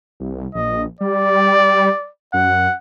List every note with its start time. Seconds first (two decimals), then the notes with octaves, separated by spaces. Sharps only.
0.20 C2
0.55 A#1 D#5
1.01 G3 D5
2.34 F#2 F#5